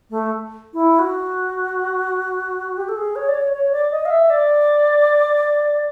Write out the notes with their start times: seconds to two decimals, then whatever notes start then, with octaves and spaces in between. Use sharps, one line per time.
0.10 A3
0.73 E4
0.99 F#4
2.77 G4
2.89 A4
2.96 G#4
3.16 C#5
3.28 D5
3.34 C#5
3.53 C#5
3.72 D5
3.91 D#5
4.05 F5
4.11 E5
4.30 D5